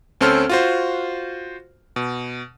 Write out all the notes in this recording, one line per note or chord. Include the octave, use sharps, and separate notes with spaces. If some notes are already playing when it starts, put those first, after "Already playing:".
D2 C4 C#4 A4 C5 F6
F4 F#4 C5
B2